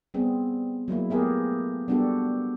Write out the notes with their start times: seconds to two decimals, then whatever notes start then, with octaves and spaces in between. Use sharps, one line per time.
0.14 G3 B3 C4 G#4
0.88 F#3 G#3 A#3 E4
1.10 A3 B3 G4 G#4 A#4 B4
1.88 G3 B3 D4 F#4 G4 A4